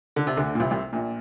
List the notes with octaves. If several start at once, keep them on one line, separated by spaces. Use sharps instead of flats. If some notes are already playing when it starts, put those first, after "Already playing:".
D3
C3
D2 D3
A#2
C2 C3
C2 C3
A#1 A#2